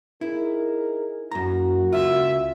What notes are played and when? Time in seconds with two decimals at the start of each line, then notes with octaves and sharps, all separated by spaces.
0.21 D#4 E4 G#4 A#4
1.31 F#2 A#3 E4 F#4 A#5
1.93 C#2 F4 E5